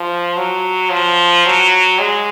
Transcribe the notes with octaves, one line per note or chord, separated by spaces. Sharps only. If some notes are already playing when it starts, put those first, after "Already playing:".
Already playing: F3
F#3
F3
F#3
G#3